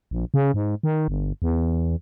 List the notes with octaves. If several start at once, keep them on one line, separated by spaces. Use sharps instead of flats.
A#1
C#3
G#2
D#3
G1
E2